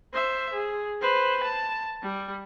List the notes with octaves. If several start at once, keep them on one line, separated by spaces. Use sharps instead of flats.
C5 E5
G#4
B4 C5
A5
G3